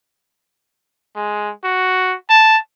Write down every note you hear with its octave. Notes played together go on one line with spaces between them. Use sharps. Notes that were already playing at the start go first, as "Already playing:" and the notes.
G#3
F#4
A5